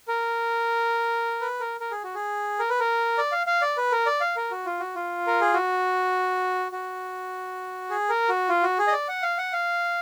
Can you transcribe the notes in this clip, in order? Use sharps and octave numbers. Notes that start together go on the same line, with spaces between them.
A#4
B4
A#4
A#4
G#4
F#4
G#4
A#4
B4
A#4
D5
F5
F5
D5
B4
A#4
D5
F5
A#4
F#4
F4
F#4
F4
A#4
G#4
F#4
F#4
G#4
A#4
F#4
F4
F#4
G#4
D#5
D5
F#5
F5
F#5
F5